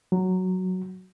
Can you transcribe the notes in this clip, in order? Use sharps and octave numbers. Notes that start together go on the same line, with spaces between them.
F#3